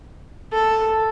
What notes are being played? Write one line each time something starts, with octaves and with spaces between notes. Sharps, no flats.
A4